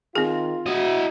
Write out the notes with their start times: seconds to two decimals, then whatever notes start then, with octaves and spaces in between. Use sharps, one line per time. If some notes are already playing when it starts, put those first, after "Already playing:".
0.15 D#3 C4 F4 G#4
0.66 E4 F#4 D#5